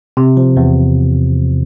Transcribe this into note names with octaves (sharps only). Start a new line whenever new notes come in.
C3
F3
E2